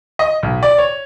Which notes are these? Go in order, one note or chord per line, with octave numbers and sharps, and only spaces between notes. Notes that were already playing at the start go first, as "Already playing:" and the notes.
D#5
B1
D5
C#5